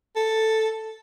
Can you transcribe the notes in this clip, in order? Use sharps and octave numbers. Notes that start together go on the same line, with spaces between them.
A4